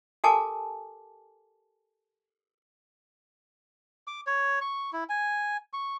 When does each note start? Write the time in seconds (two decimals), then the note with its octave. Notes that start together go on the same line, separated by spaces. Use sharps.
0.24 G4 A4 A#4 G#5 A5 D6
4.07 D6
4.27 C#5
4.61 C#6
4.93 E4
5.09 G#5
5.73 C#6